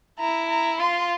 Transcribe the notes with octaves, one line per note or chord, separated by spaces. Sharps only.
E4 A#5
A#5
F4 C6